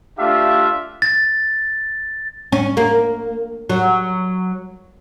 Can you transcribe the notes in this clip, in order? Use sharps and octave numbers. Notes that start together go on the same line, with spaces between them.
A3 D4 F4 G4 E5 F5
A6
C#4
A#3
F#3